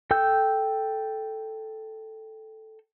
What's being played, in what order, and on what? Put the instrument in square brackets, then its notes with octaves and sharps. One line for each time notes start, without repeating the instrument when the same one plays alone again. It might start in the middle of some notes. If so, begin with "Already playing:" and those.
[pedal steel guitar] A4 G5 E6 G6